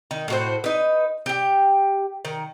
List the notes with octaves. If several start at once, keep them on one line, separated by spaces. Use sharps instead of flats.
D#3
A2 F#4 C5
D#4 B4
G4 G5
D#3